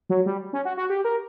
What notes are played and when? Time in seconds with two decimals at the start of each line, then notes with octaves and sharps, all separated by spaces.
0.10 F#3
0.26 G3
0.53 C#4
0.65 F#4
0.77 F#4
0.90 G4
1.05 A#4